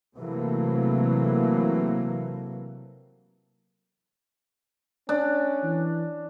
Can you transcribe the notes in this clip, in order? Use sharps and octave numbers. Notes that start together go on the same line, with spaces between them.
C3 E3 F#3 A3 A#3
C#4 D4
E3